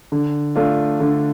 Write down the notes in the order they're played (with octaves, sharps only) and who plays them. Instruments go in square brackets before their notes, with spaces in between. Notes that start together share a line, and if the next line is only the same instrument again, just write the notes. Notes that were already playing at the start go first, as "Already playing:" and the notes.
[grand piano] D3
A3 D4 F4
D3